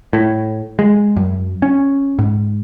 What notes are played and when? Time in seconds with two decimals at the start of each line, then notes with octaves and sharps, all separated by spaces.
0.13 A2
0.79 G#3
1.17 F#2
1.62 C#4
2.19 G#2